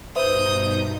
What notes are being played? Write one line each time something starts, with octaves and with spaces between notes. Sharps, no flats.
G2 B2 D#4 B4 C5 E5 D#6 G6